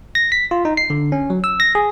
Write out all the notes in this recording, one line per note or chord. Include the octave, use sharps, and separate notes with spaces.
A#6
B6
F4
D#4
C7
D3
C#4
F#3
E6
A#6
G#4